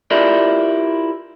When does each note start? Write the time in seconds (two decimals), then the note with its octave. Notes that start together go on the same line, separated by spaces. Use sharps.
0.11 E4 F4 G4 A#4 D5